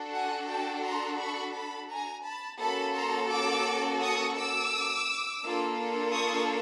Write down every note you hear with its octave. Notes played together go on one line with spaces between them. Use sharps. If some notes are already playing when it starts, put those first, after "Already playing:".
Already playing: D4 F#4 A4
F#5 G#5
G5 A5
A#5 C6
B5 C#6
A5 B5
G#5 A#5
A5 B5
A#3 C#4 F#4 A4 A5 B5
A#5 C6
D6 E6
C#6 D#6
D6 E6
A#3 D4 F4 A4
C#6 D#6